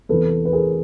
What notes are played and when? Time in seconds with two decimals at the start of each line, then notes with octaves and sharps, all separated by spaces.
0.09 E2 C3 E3 A4 B4
0.45 B4
0.53 G#4 A#4